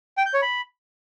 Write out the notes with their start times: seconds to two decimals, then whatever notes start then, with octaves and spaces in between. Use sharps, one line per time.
0.18 G5
0.26 G6
0.34 C#5
0.42 B5